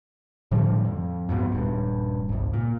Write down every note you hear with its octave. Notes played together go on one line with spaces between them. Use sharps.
A2 D3 F3 G3
F2
F2 G#2 B2
D#1 G2
G#1 C#2
A#2